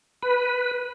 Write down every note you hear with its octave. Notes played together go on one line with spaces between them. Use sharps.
B4